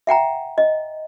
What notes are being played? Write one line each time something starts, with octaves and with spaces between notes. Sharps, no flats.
E5 F#5 G5 A#5
D#5